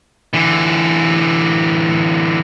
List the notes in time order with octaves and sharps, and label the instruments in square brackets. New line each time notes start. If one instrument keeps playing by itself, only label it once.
[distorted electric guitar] D3 E3